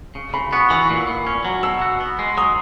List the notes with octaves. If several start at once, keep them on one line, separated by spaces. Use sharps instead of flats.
C#3
C#3 B5
B3 C#6
E3 C#6
A#2
A#2
C#4
F#3
B2 E6
F#4
B3
G#3
F#3 D#6